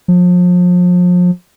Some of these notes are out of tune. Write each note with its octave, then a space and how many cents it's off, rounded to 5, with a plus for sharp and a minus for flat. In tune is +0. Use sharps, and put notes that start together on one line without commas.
F3 +35